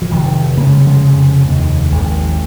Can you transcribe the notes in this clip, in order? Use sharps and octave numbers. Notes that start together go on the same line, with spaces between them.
F3
F1 D#3 F#3
C#3 A#3
G#3
F#3
F3 G#3
F1
D#2
G#1